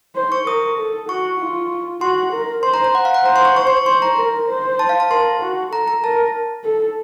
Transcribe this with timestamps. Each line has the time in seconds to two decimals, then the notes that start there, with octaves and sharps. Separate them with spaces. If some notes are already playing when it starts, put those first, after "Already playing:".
0.16 C5
0.32 C#6
0.47 A#4 D#6
0.78 A4
1.09 F#4 C#6
1.40 F4
2.01 F#4 C6
2.33 A#4
2.63 C5 C6
2.74 A#5
2.84 A#5
2.95 F#5
3.05 F5
3.14 F#5
3.25 C5 A#5
3.36 C6
3.45 C#6
3.56 C#6
3.67 C6
3.77 C#6
3.86 C5 C6
4.02 A#5
4.18 A#4
4.49 C5
4.79 A5
4.89 F5
5.00 A5
5.10 A#4 C6
5.42 F#4
5.72 A4 A#5
5.88 A#5
6.03 A#4 A5
6.65 A4